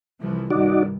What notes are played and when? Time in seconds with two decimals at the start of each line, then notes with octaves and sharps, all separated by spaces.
0.20 C2 E3 F3
0.50 C2 G2 D#3 D#4 F#4 D5